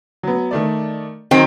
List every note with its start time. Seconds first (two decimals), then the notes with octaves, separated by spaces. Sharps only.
0.23 F#3 B3
0.51 D#3 A3 D5
1.31 D#3 F#3 C4